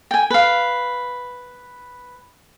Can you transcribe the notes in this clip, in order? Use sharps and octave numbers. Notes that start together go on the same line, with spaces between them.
G5 G#5
B4 F5